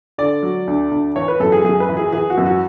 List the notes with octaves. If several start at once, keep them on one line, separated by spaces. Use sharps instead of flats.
D3 D5
F#3
D2
D2
E3 C#5
B4
F#2 A4
G#4
F#2 G#4
B4
E3
G#4
E3 G#4
F#4
F#2
F#4